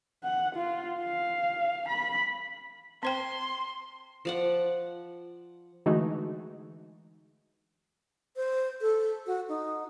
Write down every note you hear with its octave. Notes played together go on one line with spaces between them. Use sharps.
F#5
F4
F5
B5
C4 C5 G5 C6
F3 D5 F#5
D3 E3 G#3 A3 D#4 F#4
C5
A4
F#4
D#4